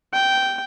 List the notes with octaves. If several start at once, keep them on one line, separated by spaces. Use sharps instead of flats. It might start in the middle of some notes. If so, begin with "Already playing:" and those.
G5